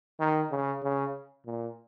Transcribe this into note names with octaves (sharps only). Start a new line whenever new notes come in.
D#3
C#3
C#3
A#2